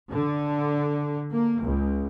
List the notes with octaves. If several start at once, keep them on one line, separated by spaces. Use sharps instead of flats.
D3
A#3
C#2